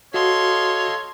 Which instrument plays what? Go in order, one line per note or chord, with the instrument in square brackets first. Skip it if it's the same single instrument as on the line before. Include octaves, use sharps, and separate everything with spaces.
[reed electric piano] F#4 [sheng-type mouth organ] A4 D#5 F5 [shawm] C#5 [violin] C6